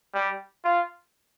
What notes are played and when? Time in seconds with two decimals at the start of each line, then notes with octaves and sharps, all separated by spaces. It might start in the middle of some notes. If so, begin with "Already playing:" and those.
0.14 G3
0.65 F4